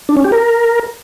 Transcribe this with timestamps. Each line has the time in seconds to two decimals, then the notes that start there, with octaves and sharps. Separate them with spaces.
0.09 D4
0.17 C#4
0.24 G4
0.32 A#4